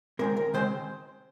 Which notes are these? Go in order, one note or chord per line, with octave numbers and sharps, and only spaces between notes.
D#3 G#3 C4 A#4
A#4
D#3 G#3 C4 C5